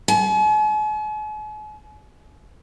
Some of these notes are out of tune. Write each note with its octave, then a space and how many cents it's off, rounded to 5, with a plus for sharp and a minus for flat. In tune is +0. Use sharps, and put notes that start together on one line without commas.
G#5 +45